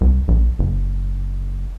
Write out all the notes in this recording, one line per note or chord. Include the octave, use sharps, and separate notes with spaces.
C2
A#1
F#1